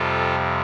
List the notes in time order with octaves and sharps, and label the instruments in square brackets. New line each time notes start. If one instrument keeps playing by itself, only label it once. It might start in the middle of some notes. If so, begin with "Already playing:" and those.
Already playing: [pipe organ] F2 C3 G3 F4 A4